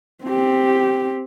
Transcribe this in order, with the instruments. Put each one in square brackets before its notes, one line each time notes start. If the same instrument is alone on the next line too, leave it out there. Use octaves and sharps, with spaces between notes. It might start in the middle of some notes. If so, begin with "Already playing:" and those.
[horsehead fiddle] C4 G4